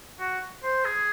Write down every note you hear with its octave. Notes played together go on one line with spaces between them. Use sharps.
F#4
C5
G#4